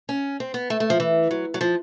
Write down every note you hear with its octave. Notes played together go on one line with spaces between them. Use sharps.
C#4
C4
B3
A3
A3
F3
E3
F#3
F#3
F3